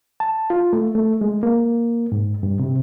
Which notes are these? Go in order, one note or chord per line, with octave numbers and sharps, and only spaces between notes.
A5
F4
A3
A3
G#3
A#3
G#2
G2
C3